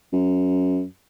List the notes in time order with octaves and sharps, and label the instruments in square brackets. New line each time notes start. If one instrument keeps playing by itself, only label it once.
[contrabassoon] F#2